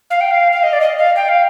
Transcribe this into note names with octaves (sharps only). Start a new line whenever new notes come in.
F5
G5
F5
F5
D#5
D5
D#5
F5
G5
F5